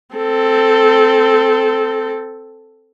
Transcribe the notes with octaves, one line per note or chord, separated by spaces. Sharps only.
C4 A4